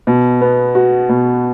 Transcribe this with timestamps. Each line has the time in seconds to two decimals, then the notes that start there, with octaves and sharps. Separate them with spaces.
0.07 B2
0.41 B3
0.75 F#4
1.09 B2